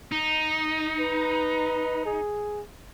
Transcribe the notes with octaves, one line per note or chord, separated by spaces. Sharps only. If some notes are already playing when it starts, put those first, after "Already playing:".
D#4
B4
G#4